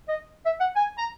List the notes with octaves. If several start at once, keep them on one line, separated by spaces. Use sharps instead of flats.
D#5
E5
F#5
G#5
A#5